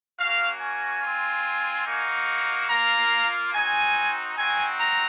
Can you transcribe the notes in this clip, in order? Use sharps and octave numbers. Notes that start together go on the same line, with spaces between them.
A#3 C#4 F#4 F5
G#5
C4 F4
A#3 D#4 F#4
A#3 F4 A#5
C4 D#4 F#4 G#5
C4 D#4 F#4 G#5
A#5